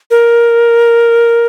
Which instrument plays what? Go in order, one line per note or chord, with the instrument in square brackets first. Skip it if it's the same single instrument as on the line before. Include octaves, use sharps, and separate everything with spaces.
[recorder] A#4